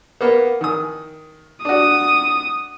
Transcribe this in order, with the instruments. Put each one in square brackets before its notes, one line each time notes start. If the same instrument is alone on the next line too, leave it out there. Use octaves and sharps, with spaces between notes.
[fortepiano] A#3 B3
D#3 D#6
[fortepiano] D4 F#4 [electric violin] D#6